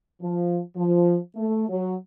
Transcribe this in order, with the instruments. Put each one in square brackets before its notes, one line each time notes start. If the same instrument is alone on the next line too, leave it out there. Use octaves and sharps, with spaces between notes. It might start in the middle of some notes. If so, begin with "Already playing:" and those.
[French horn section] F3
F3
A3
F#3